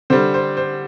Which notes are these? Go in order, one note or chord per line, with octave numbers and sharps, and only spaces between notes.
D3 G3 C5
C5
C5